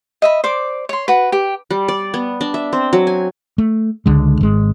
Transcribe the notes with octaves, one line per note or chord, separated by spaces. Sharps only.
D#5 E5 B5
C5 D5 D6
C#5 C6
F#4 B4
G4
G3
D5
B3
D4
E5
C4
F#3
G#5
A3
C#2 D3 G#3
G#1 G#3